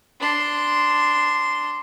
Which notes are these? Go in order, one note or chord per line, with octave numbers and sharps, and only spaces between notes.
D4 C6